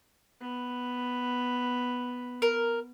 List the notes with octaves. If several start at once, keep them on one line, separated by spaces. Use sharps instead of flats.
B3
A#4